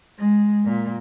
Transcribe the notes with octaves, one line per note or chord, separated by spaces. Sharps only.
G#3
A#2